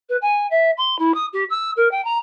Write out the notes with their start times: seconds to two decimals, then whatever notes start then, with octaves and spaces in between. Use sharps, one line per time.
0.09 B4
0.21 G#5
0.50 E5
0.77 C6
0.99 E4
1.14 D#6
1.33 G4
1.50 E6
1.76 A#4
1.91 G5
2.05 A#5